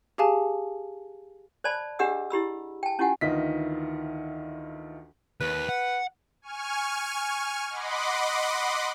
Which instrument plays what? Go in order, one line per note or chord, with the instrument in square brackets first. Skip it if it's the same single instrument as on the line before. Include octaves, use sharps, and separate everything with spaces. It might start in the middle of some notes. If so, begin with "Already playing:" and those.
[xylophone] G4 G#4 F5 G#5 A5
[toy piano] C5 D5 A5 B5
D4 G4 G#4 D#5 F#5 E6
E4 G4 B5 E6
G5 A5
C#4 E4 F4 G4 F#5 G#5
[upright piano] D2 D#3 E3 F4 D#5 B6
[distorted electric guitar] D#2 [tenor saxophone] B4
[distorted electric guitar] F#5
[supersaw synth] G#5 C#6 F6
D#5 F#5 B5 C6 D6